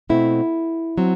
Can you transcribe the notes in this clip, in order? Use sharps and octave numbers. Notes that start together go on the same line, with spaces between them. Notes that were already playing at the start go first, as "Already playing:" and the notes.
B2 A3 C4 E4
F#3 C4